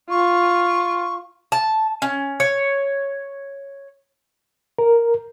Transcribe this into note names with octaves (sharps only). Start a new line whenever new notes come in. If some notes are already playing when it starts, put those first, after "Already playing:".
F4 C#6
A5
C#4
C#5
A#4